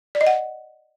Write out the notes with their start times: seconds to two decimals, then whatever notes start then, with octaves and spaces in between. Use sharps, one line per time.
0.15 D5
0.21 D#5
0.27 F#5